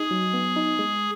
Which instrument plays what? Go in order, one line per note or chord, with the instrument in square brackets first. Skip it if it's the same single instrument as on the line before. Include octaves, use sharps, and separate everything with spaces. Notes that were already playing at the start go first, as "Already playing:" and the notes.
Already playing: [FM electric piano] D#4 [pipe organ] G#4
[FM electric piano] F#3
B3
D#4
G#3